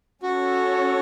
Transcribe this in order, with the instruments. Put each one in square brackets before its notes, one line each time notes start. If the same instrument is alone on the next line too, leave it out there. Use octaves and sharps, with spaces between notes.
[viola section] C#4 A4 C#5 [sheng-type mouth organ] F#4